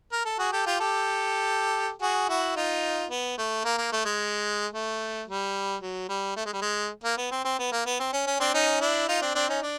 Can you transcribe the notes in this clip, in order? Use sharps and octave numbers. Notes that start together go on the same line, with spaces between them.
A#4
A4
F#4 G#4
G4 A4
F4 G4
G4 A4
F#4 G#4
E4 F#4
D#4 F4
B3
A3
A#3
A#3
A3
G#3
A3
G3
F#3
G3
A3
G#3
G3
G#3
A#3
B3
C4
C4
B3
A#3
B3
C4
C#4
C#4
C4 D4
C#4 D#4
D4 E4
D#4 F4
C4 D4
C4 D4
C#4 D#4
D4